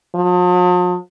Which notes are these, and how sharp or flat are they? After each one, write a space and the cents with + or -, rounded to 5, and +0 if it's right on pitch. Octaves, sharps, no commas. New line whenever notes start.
F3 +45